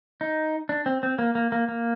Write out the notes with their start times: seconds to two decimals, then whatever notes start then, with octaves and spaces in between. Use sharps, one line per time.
0.21 D#4
0.69 D4
0.86 C4
1.03 C4
1.19 A#3
1.35 A#3
1.52 A#3
1.69 A#3